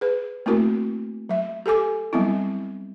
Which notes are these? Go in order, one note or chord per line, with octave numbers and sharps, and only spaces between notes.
G#4 B4
A3 A#3 C4 E4 F#4 A#4
F#3 E5
G4 A4 G#5 D6
F#3 G3 B3 C4 E4